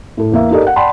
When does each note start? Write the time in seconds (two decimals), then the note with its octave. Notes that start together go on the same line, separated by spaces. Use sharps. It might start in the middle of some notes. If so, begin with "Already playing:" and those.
0.17 A2 A4
0.32 E2 A#3 E5
0.51 D#4 G4 A4 A#4 D5 D#5
0.63 F5 F#5
0.76 D5 F#5 G5 A5 B5 C6